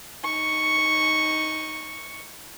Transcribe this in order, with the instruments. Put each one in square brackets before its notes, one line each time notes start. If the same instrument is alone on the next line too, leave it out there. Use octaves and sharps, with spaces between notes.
[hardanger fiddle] D#4 C#6